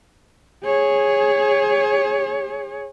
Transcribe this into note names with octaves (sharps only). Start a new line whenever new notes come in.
G#4 C#5